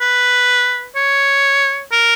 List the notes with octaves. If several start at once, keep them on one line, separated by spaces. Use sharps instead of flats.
B4
C#5
A#4